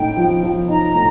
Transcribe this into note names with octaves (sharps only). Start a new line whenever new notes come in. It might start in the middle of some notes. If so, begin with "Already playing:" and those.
Already playing: A2 D#4 G5
F3
F3
D#4 A#5
A2